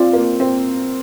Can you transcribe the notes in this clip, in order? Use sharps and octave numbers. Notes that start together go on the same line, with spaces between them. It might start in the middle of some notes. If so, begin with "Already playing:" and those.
Already playing: C4 F4 D5 F5
A#3
C4